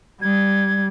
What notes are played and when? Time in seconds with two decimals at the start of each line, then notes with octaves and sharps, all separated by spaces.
0.22 G3 G#6